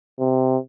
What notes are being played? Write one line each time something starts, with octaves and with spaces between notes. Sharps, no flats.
C3